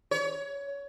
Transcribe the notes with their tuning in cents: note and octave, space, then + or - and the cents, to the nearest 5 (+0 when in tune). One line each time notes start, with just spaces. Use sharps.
C#5 +20